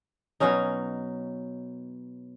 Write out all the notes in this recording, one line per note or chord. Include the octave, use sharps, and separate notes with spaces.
B2 F#3 C#4 D#4